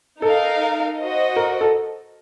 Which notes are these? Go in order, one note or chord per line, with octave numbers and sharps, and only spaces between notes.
D#4 A4 A#4 F5
F#4 C5 D#5
A#4
A4